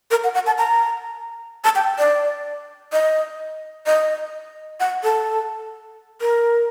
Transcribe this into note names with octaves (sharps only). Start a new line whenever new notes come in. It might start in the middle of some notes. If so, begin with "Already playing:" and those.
A#4
F#5
F#5
A5
A#5
A5
G5
D5
D#5
D#5
F#5
A4
A#4